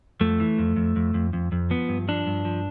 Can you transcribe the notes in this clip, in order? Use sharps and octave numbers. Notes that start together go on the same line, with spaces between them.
F2 A3
E3
F2
F2
F2
F2
F2
F2
F3 B3
G2
F3 D4
G2
F3